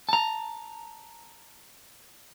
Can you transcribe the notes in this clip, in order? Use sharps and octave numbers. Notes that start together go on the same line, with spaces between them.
A5 A#5